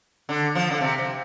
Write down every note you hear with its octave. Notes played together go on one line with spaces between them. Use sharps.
D3
F3
D3
C3
C3